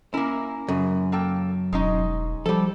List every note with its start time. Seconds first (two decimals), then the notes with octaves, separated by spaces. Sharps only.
0.14 A#3 C#4 E4 A#4
0.68 F#2 C#3
1.12 A#3 A4 G5
1.73 E1 G#3 C#4 D#4
2.46 F3 G3 A4